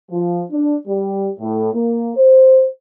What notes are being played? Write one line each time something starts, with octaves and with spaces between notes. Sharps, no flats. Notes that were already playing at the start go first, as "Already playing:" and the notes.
F3
D4
G3
A2
A#3
C5